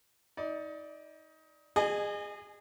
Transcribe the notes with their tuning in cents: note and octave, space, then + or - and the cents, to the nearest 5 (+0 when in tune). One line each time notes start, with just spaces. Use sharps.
D#4 +25 D5 +0
G#4 -15 D#5 -35 G#5 +10